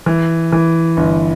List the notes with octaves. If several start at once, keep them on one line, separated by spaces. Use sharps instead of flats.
E3
E3
G1